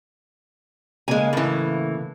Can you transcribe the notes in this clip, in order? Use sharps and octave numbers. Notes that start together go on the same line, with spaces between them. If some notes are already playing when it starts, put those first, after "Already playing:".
C#3 G#3 A#3 F5 G#5
A2 E3